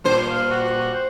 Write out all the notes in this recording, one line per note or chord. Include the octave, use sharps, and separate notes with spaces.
G2 A#2 C5
F5
F#4
C5